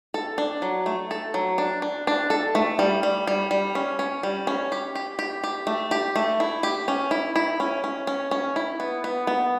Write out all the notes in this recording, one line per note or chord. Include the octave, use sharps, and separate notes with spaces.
A4
D4
F#3
A3
A4
F#3
D4
D4
D4
A4
A3
G3
G3
G3
G3
C#4
C#4
G3
C#4
G4
G4
G4
G4
A3
G4
A3
E4
G4
C#4
E4
E4
C#4
C#4
C#4
C#4
E4
B3
B3
B3